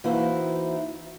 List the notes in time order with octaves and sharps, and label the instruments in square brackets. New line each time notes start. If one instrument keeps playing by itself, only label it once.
[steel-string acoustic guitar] E3 A#3 D#4 E4 F#4 C5